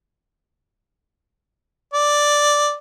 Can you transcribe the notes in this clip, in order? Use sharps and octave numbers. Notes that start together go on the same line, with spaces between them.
D5